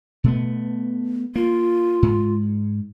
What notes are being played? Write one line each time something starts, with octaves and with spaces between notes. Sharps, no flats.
B2 A3 B3
A#3 F4
G#2